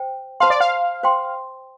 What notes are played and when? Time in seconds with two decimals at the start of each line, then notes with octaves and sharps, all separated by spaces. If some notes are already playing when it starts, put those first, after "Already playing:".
Already playing: C5 G5
0.40 C5 F5 A5 C6
0.50 D5
0.60 F5
1.03 C5 G5 C6